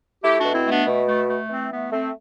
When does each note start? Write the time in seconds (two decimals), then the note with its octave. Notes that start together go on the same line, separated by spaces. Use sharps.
0.22 A3 E4 G4
0.38 D4 F#4
0.44 B2
0.54 C4 E4
0.65 A3 B3 D4
0.87 B2
1.07 A3
1.28 A3
1.50 E3 C4
1.71 A3 B3
1.92 A3 C4